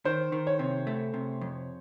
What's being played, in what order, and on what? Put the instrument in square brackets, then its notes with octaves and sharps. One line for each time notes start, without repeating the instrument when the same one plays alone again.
[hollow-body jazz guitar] D#3 [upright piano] C5
[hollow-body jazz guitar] D#3
[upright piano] C#5
[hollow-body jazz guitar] C3
A3
C3
F2